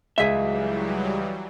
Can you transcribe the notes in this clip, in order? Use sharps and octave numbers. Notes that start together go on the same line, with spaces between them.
C#2 E3 F#3 G3 G#4 E5 B6